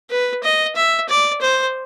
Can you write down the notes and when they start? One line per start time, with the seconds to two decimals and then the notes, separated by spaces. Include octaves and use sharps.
0.11 B4
0.44 D#5
0.76 E5
1.09 D5
1.41 C5